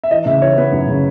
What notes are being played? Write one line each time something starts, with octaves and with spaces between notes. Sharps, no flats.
E5
E3 D#5
C#3 E5
E3 C#5
B3 B4
F#2
C#3